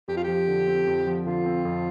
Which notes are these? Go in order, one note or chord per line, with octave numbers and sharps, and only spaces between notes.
F2 G4
F4
F3 G4
D3
C4
F2
F3
D3 F4
C4
F2